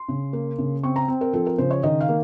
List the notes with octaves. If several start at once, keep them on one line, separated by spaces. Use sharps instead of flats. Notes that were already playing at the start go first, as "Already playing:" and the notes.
Already playing: C6
C#3
A#3
C#3
C4 C#6
A#5
C4
A#4
F3 A4
A#4
C#3 C5
C#5
D#3 D#5
F5
A#3